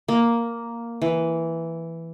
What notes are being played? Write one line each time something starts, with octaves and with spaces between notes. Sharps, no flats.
A#3
E3